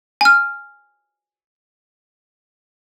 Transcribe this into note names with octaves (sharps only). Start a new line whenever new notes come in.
G#5 F6